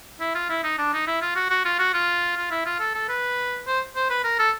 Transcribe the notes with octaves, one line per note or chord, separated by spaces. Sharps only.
E4
F4
E4
D#4
D4
D#4
E4
F4
F#4
F#4
F4
F#4
F4
F4
E4
F4
A4
A4
B4
C5
C5
B4
A#4
A4